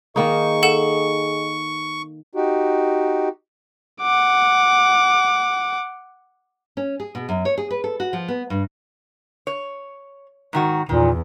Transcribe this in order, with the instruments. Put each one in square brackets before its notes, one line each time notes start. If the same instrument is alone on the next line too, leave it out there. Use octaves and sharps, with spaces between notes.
[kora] D#3 A#3 D#4 [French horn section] G#4 D#5 [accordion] C#6
[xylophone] A4 F#5 E7
[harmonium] D#4 F#4 G4
[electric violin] F#5 D6
[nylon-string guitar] C#4
G#4
B2
F#2
C#5
G#4
B4
A4
F#4
F3
B3
G2
[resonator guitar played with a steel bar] C#5
G#2 D#3 F#4
[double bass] E2 [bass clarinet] A#2 [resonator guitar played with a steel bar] D#3